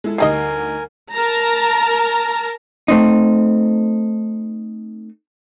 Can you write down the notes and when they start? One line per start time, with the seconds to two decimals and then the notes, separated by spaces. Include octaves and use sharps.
0.04 G#3 E4 A4
0.18 D2 G3 D#4 G#4 A#4 D#5 G#5 C7
1.12 A#4 A5 A#5
2.88 A3 C4 D#4